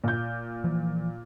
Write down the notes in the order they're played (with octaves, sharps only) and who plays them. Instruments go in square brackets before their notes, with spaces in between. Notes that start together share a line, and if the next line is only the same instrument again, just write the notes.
[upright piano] A#2 G6
[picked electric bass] E3 F3